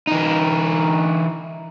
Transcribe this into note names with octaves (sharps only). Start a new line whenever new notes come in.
E3 D#4